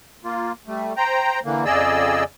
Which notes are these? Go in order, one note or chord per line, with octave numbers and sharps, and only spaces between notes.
A#3 F4
G3 A3
C5 G5 A#5
D3 E3 A#3
F2 C#3 G#4 D5 D#5 E6